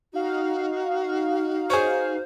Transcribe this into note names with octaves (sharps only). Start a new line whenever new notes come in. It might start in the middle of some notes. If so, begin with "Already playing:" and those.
D#4 F#4 F5
G#4 C5 C#5